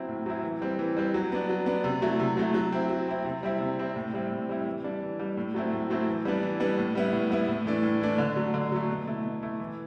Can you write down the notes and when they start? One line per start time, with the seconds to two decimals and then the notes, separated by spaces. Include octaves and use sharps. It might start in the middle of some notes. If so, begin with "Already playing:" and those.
Already playing: F#3 C4 E4
0.08 A2
0.26 F#3 C4 E4
0.43 E3
0.61 G3 C4
0.79 E3
0.97 G3 C4
1.14 F#3
1.32 B3 D4
1.49 F#3
1.66 B3 D4
1.84 C3
2.02 F#3 A3 E4
2.20 C3
2.37 F#3 A3 E4
2.54 F#3
2.72 C4 E4
2.90 F#3
3.08 C4 E4
3.25 C3
3.43 G3 C4 E4
3.61 C3
3.78 G3 C4 E4
3.96 A2
4.13 G3 C4 E4
4.31 A2
4.49 G3 C4 E4
4.67 E3
4.84 G3 D4
5.02 E3
5.19 G3 D4
5.37 A2
5.54 F#3 A3 C4 E4
5.72 A2
5.90 F#3 A3 C4 E4
6.08 E3
6.25 G3 B3 D4
6.43 E3
6.60 G3 B3 D4
6.78 A2
6.95 G3 B3 E4
7.13 A2
7.30 G3 B3 E4
7.48 A2
7.66 E3 A3 D4
7.83 A2
8.01 E3 A3 D4
8.18 D3
8.36 F#3 A3
8.54 D3
8.72 F#3 A3
8.89 B2
9.07 A3 E4
9.25 B2
9.43 A3 E4
9.60 E3